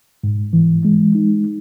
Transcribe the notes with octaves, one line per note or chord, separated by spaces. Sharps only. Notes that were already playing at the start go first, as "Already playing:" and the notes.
G#2
E3
G#3
D#4